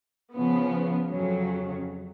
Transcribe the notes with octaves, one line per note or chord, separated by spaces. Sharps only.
C#3 F3 B3
F2 C#3 F#3